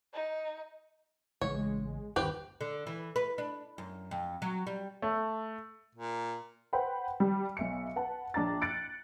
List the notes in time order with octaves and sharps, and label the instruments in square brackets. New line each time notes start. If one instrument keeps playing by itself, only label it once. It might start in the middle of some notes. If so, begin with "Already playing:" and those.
[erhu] D#4
[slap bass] A1 C#3 [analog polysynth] G#3 [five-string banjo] C#5
[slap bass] G1 D#2 C#4 [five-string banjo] G4 B4 C5
[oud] D3
E3
B4
D4
F#2
F2
F#3
G3
[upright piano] A3
[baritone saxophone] A#2
[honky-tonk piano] B4 C5 F#5 G5 B5
G3
B1 E5 C#7
B4 F#5 A5
A#1 D4 A#5 A6
F#6 A6 C#7 D7